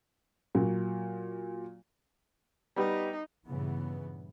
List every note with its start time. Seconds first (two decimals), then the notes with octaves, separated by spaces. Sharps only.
0.55 A#2 F#3
2.76 G3 B3 D#4 G4
3.46 G2 A#2 C#3 E3 B3